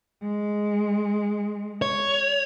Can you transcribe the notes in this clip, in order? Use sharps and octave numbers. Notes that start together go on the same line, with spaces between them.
G#3
C#5